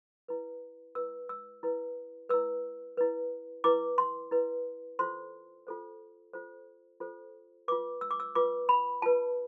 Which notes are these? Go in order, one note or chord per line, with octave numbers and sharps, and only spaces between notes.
E4 B4
E4 B4 E6
E6
E4 B4
E4 B4 E6
E4 B4
E4 B4 D6
C6
E4 B4
F4 A4 C5 C6
F4 A4 C5
F4 A4 C5
F4 A4 C5
F4 B4 D6
E6
D6
E6
F4 B4 D6
B5
F4 B4 A5